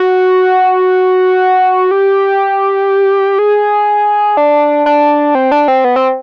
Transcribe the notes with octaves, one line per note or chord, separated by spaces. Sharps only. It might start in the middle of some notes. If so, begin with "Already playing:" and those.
Already playing: F#4
G4
G#4
D4
D4
C4
D4
C4
B3
C4